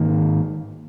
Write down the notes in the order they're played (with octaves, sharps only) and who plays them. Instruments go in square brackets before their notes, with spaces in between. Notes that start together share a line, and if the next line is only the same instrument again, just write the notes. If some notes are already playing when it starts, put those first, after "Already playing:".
Already playing: [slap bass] G#2 D#3 A#3